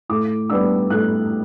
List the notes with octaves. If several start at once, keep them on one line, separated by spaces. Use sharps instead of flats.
A2 D6
G3 B3 D4 E6
A2 F#6